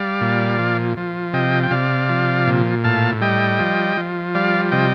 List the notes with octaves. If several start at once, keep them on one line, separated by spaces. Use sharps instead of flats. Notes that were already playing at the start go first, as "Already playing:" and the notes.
Already playing: G3 D5 F5
A#2
F3
F3
C3 D#5 G5
G5
C3 D5 F5
F3
A#2
A2 F5 A5
G3 D#5 G5
F3
F3
G3 D5 F5
C3 D#5 G5